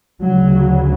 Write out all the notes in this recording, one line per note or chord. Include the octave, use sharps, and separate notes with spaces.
D2 C#3 F#3